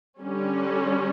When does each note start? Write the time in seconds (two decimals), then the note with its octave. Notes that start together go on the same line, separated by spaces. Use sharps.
0.19 D3 G3 C#4